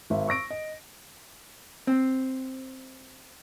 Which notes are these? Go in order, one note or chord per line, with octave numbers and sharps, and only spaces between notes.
G#1 E5
C#6 E6 A#6 D7
D#5
C4